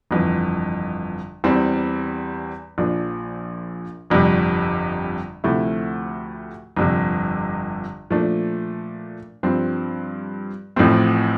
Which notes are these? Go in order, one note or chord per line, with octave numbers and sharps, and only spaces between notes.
G1 F2 E3
E2 E3 G3 C4
A#1 A#2 F3 A#3 D4
G1 F2 C3 G3
D2 C3 F3 A3 E4
G1 F2 C3
A#2 F3 A3 D4
G2 F3 C4
A1 A2 F3 A3 C4